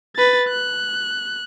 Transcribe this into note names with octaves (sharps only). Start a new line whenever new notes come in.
B4 A6
F#6